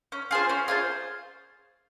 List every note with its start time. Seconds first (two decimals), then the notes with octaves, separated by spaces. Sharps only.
0.12 C#4
0.31 F4 G#4 C5
0.49 C#4
0.68 F4 G#4 C5